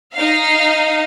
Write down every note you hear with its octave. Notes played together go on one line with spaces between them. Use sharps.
D#4 F5